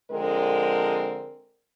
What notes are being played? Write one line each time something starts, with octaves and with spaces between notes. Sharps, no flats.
D3 F3 G#3 C4 A#4